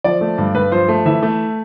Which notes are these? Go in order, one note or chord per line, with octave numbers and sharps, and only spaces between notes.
F3 D5
A3
G2
G2 B4
F3 C5
A3
E3 E5
A3